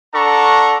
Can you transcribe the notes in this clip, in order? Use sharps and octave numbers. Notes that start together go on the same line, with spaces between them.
D4 A4 F#5 A5 A#5 C#6